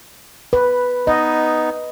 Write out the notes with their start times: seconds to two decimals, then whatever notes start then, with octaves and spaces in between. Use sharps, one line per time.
0.53 B4
1.07 B3 D#4 D#5